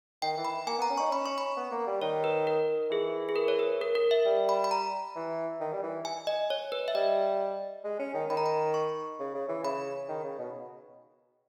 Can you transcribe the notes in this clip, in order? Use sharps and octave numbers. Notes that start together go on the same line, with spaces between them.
D#3 G5
E3
B5
A#3 G#5
B3
A#5
C#4
D#4 C#6
C#4 B5
C#6
B5
B3
A#3
G3
D#3 C#5
B4
A#4
E3 G#4
G#4
A#4
C#5
B4
A#4
A#4
E5
G3
B5
B5
A#5
E3
D#3
G3
E3
G#5
D#5
C#5
B4
E5
G3 D#5
G#3
C#4
D#3
D#3 B5
A#5
B5
C#6
C#3
C#3
E3
C#3 B5
D#3
C#3
B2